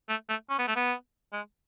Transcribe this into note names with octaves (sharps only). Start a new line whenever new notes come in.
A3
A3
C#4
B3
A3
B3
G#3